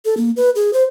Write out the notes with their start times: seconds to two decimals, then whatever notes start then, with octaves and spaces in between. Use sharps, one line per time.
0.05 A4
0.17 A#3
0.36 B4
0.55 G#4
0.73 C5